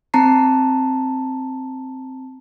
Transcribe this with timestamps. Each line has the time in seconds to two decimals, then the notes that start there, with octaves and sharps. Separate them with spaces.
0.14 C4 A5 A#5 C7